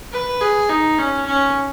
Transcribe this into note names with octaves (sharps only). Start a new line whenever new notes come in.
B4
G#4
D#4
C#4
C#4